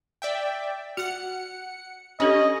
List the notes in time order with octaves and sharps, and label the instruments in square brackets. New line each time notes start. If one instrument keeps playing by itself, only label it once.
[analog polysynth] D5 E5 G5
[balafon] F#4 [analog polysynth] F#5 C#7
[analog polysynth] C#4 [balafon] D4 G4 A4 [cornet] D#5